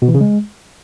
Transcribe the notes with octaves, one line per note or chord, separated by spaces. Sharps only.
B2
E3
C#3
G#3